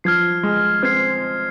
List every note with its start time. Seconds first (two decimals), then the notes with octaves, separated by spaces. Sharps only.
0.04 F3 F6 G#6 C7
0.43 G#3
0.83 C4 F6 G#6 C7